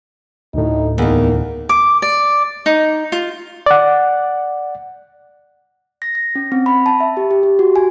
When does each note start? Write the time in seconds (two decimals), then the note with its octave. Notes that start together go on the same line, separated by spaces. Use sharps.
0.54 D2 A2 D#4
0.98 E2 D#3 A#3
1.69 D6
2.02 D5
2.66 D#4
3.12 F4
3.66 D5 F#5
6.02 A#6
6.15 A#6
6.35 C#4
6.52 C4
6.66 B5
6.86 A5
7.00 E5
7.17 G4
7.31 G4
7.43 G4
7.59 F#4
7.76 G#5